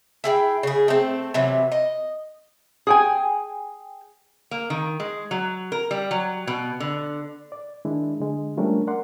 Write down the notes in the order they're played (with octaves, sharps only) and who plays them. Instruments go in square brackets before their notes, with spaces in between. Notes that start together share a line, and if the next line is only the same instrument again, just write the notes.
[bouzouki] E4 G#4 G5
C#3 G#4
A3 C4
C3 E3 F#3
D#5
[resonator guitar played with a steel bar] G#4 G5 G#5
A#3
D#3
G#3
F#3
A#4
G3
F#3
B2
D3
[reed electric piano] D5
D#3 G#3 D4 E4
D3 G#3
F3 G3 A3 C#4 D4 A#4
A#4 D5 F#5 C6